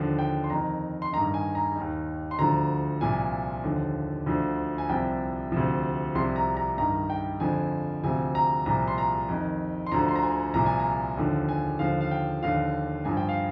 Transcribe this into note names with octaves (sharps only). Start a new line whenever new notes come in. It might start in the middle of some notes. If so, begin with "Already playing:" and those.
Already playing: D#2 D3 F3
G5
C6
F2 A#5
D#3
C6
G2 D#3 A#5
G#5
A#5
D#2 D#3
C6
D2 D3 F3 A#5
C2 A#2 F3 G#5
D#2 D3 F3
D2 D3 F3
G#5
C2 C3 F3 G5
D2 C3 F3
C2 C3 F3 C6
A#5
A#5
G2 D#3 A#5
G5
F2 D3 F3 G#5
D2 C3 F3 G#5
A#5
C2 A#2 F3 A#5
C6
A#5
F2 D#3
C6
D2 D3 F3 A#5
C6
A#5
G#5
C2 A#2 F3 A#5
G#5
A#5
D#2 D3 F3
G#5
D#2 D3 F3 F5
F5
G5
D#2 D3 F3 F5
G2 F3 G#5
G5
F5